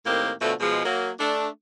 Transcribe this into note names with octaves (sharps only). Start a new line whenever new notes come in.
A2 D#3 A#3 C4 G4
B2 D3 F3 A3
B2 F3 G#3
F#3 A#3
A3 D4